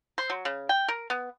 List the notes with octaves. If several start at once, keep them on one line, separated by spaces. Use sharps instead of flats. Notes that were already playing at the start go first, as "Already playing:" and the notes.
C5
F#3
C#3
G5
A#4
B3